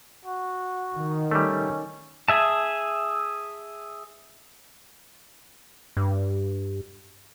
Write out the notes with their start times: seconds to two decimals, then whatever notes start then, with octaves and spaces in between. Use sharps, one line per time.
0.25 F#4
0.95 D#3
1.31 G3 A3 C#4
2.28 G#4 E5 A5
5.97 G2